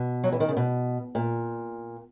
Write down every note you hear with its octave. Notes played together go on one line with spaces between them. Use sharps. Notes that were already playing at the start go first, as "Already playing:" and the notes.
Already playing: B2
F#3
E3
D#3
C#3
B2
A#2